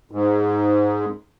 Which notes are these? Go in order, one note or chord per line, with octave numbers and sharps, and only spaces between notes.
G#2